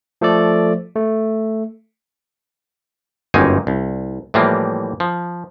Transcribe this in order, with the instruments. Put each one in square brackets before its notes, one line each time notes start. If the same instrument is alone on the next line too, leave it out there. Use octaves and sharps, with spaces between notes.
[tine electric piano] F3 A3 A4 D5
A3
[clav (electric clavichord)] G1 F#2 D#3 A#3 D#4 G#5
C2
A2 E3 F3 G3 A#3
F3